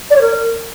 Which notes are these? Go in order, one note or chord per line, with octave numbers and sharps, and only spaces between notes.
D5
C#5
A#4